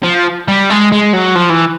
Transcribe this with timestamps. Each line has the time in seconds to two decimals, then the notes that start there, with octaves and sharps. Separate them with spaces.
0.04 F3
0.48 G3
0.70 G#3
0.92 G#3
1.13 F#3
1.36 F3
1.50 E3